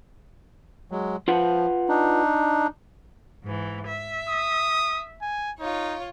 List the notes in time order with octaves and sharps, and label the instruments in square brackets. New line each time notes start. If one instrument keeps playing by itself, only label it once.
[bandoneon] F#3 G#3
[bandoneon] F3 [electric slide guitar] F4 B4 F#5
[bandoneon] D4 D#4
[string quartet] G#2 E3
E5
[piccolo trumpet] D#6
G#5
[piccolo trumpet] D#4 [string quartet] F4 C#5